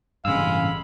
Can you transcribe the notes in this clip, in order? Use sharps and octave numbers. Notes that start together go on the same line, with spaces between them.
A1 G2 C#3 G#3 F5 B5 E6